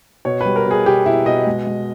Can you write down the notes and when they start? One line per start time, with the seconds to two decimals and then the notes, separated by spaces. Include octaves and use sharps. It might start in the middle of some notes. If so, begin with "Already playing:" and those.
0.25 B2 C#5
0.41 G3 B4
0.56 A#4
0.66 B2 G#4
0.86 B2 G4
1.06 B2 E4
1.26 B2 D#5
1.47 G#3
1.66 G#3